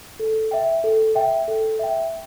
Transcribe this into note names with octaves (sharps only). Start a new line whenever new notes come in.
A4
E5 G5
A4
E5 G5
A4
E5 G5